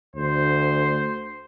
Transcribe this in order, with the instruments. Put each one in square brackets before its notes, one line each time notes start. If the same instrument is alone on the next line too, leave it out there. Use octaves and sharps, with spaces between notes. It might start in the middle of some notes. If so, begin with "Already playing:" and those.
[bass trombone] D2 [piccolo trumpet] C5